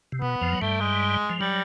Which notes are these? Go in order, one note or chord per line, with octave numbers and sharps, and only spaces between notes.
C3
B2 B3
F2 F3
F#3
G2 G3 A3
G#3
F3
F#3 G3